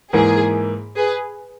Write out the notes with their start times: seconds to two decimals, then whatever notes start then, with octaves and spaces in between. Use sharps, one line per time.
0.13 G#2 E3 A#3 G#4
0.96 G#4 B4